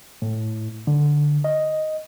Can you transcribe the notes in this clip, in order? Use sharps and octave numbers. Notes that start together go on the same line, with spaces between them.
A2
D3
D#5